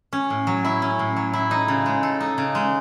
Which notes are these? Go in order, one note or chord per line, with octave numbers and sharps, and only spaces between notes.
C#4
A2
F#3
E4
C#4
A2
F#3
E4
D#4
C#3
G#3
A4
D#4
C#3
G#3